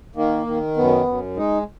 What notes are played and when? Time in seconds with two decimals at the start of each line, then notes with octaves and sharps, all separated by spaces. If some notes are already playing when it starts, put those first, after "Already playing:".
0.16 D#3 A#3
0.46 D#3
0.76 F#2 B3
1.06 F#2
1.37 G#3 D#4